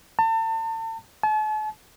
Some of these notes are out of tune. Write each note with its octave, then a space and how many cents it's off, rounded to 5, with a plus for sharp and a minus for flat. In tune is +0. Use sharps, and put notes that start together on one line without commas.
A5 +35
A5 -45